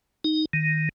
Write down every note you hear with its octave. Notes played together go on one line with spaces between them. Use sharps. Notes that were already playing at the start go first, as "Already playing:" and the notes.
D#4
D#3